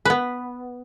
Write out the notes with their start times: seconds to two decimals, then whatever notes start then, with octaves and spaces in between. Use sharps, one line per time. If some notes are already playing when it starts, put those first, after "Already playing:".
0.05 B3 B4